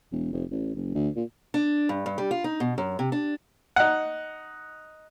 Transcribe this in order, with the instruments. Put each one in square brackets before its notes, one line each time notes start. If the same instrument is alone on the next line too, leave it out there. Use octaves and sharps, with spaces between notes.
[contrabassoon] E1
F1
A1
F#1
D2
A#2
[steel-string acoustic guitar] D4
G2
G2
G3
F4
D#4
B2
F#2
C3
D4
[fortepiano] D#4 F#5